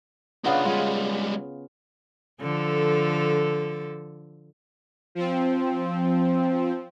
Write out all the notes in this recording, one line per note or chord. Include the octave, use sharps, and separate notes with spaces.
C#3 B3 D4 F4 D#5
G3 G#3 F4
D3 F3 A4
F3 C4